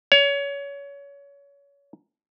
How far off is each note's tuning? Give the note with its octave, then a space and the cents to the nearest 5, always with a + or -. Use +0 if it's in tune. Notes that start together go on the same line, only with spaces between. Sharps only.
C#5 +25